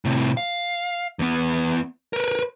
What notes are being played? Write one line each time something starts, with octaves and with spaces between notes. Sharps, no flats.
A2 C3
F5
E2 B3
A#4 B4